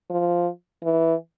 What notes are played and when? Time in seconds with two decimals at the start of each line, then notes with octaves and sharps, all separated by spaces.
0.10 F3
0.83 E3